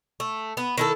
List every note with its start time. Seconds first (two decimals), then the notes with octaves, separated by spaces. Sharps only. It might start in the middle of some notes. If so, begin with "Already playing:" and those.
0.20 A3
0.57 B3
0.78 D#3 E4 A4